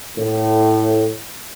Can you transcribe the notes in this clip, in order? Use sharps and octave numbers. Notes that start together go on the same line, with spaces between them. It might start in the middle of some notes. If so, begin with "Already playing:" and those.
A2